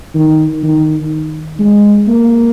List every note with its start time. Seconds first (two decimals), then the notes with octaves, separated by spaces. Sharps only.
0.15 D#3
0.63 D#3
1.59 G#3
2.08 A#3